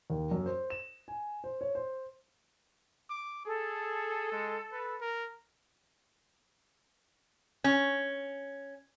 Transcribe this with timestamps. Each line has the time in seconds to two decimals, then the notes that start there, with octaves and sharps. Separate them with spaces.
0.10 D#2
0.31 F#2
0.46 C5
0.70 E7
1.08 G#5
1.44 C5
1.61 C#5
1.75 C5
3.10 D6
3.45 G#4 A4
4.32 G#3
4.72 B4
5.01 A#4
7.64 C#4